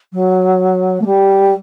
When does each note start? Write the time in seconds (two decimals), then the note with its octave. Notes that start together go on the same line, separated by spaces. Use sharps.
0.13 F#3
1.01 A3
1.05 G3